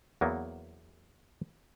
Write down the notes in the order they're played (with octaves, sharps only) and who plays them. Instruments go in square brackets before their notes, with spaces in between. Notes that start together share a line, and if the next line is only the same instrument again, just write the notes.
[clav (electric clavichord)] E2 F#3 A#3 B3